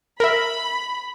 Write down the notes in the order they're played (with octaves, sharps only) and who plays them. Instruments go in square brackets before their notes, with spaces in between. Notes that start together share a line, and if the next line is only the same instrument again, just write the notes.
[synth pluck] A#4 E5 [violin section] B5